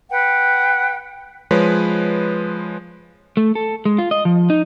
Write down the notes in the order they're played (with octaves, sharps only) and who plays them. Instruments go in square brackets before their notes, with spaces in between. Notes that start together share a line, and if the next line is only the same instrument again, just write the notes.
[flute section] B4 F#5 G5
[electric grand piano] F3 G#3 B4 C#5
[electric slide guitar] A3
A4
G#3
F4
D#5
F3
D#4